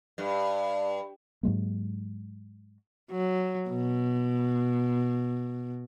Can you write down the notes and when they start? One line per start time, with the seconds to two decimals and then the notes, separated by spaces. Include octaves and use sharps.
0.18 G2
1.43 G#2 F#3 G#3 A#3
3.11 F#3
3.69 B2